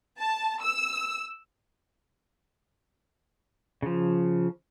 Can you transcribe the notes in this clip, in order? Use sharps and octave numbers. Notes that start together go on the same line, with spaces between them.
A5
E6
C#3 F3